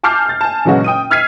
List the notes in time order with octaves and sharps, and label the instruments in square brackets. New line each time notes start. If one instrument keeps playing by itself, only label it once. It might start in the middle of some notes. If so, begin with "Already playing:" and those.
[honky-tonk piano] G#5 A5 D6 F6 G6 C7
F6 A6
G#5 A5
A#2 C#3 E3 F#3 G#3 F#4
G5 D#6 D#7
E6 F6 G#6 B6 C7 D#7